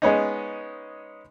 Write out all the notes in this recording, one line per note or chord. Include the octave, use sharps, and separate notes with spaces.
G#3 B3 C#4 D#4